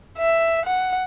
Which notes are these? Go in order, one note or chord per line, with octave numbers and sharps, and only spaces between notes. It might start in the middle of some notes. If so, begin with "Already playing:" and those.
E5
F#5